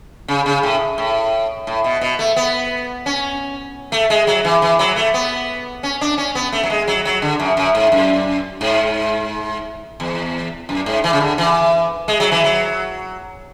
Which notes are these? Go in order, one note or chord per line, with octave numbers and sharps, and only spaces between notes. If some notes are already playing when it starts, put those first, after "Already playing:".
C#3
C#3
A2
A2
A2
B2
B2
A3
B3
C#4
A3
G#3
F#3
E3
E3
F#3
A3
B3
C#4
D4
C#4
B3
A3
F#3
G#3
F#3
F#3
D3
F#2
F#2
G#2
F#2
G#2
E2
F#2
G#2
E3
C#3
D3
E3
G#3
F#3
E3
F#3